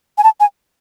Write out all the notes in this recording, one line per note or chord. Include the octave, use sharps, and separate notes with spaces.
G#5
A5
G#5